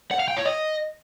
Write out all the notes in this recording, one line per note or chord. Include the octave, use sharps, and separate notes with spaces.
F#5
F5
G5
C#5
D#5